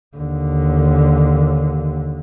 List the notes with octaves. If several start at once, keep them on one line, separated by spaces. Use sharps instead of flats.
D#2 D3